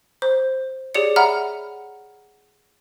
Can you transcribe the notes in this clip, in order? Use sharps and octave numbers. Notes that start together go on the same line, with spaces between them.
C5
G4 G#4 C#5 D5 C#7
E5 F#5 A#5 B5 F6